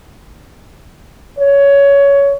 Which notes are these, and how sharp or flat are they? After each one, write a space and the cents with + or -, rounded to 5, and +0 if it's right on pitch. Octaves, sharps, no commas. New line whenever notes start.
C#5 +15